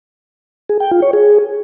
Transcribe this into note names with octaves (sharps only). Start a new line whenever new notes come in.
G#4
G5
F4
C#5
G#4